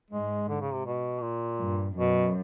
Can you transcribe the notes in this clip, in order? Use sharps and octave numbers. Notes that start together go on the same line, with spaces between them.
G#2 G#3
D3
C#3
C3
B2
A#2
G2
F#2 B2